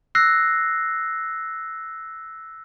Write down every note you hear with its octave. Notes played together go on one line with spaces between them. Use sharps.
E6 F#6 A#6 C7